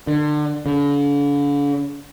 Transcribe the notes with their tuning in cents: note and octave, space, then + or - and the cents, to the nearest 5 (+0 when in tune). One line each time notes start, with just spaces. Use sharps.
D3 +30
D3 -45